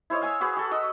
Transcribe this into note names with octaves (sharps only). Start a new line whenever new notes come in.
E4 C5 C#5 D#5
F5 G#5 D#6 E6
F#4 G#4 B4
F#4 A4
D#5 D#6 E6